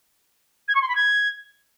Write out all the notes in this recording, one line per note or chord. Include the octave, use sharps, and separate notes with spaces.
G#6
C#6
C6
B5
G#6